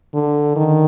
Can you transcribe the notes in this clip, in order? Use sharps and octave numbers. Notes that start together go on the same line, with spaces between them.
D3
D#3